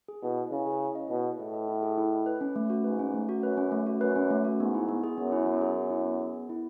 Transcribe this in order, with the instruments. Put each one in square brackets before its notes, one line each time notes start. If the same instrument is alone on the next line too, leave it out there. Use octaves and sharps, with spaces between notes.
[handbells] G#4
[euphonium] B2 [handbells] E4
[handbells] D#5
[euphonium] C#3 [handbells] E4
[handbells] G#4
E4
D#5
[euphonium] B2 [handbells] E4
[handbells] G#4
[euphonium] A2 [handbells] E4
[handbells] D#5
E4
G#4
E4
D#5
B4
C#4
A3
F#4
[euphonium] G#2 [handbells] B4
[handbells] C#4
A3
F#4
[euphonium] F#2 [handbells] B4
[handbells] C#4
A3
F#4
[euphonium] F#2 [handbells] B4
[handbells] C#4
A3
F#4
[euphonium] G#2 [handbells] B3
[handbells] E4
B3
G#4
[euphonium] F#2 [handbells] B3
[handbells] E4
B3
G#4
B3
E4
B3
G#4
B3
E4